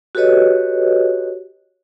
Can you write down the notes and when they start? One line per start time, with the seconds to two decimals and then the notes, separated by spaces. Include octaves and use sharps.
0.15 F#4 G4 A4 B4 C#5 D#5